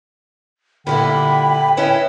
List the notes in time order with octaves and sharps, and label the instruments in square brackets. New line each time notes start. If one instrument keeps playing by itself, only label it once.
[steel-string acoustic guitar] A#2 G3 E4 [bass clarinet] D3 [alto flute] G5 [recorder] B5
[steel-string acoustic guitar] C#4 E4 D#5 [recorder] B4